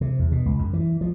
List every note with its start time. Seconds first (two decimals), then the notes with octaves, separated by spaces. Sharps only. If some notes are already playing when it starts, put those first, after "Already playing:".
0.01 C3
0.19 E2
0.32 B2
0.46 C#2
0.59 F#2
0.73 E3
1.01 F3